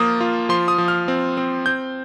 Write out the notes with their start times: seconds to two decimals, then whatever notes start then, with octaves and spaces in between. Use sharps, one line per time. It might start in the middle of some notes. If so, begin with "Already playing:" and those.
Already playing: F3 A#3 F4 D#6
0.21 F4
0.49 F3 C6
0.68 D#6
0.78 F3
0.88 F6
1.08 C4
1.37 C4
1.66 C4 G6